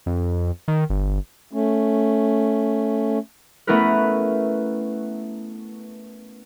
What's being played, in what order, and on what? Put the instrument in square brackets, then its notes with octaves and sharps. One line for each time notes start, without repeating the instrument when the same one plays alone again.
[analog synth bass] F2
D#3
G1
[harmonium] A3 C#4
[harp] A3 B3 C#4 E4 A#4 B4